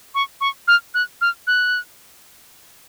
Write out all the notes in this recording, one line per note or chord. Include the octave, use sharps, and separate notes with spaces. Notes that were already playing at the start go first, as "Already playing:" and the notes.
C#6
C#6
F6
F#6
F6
F#6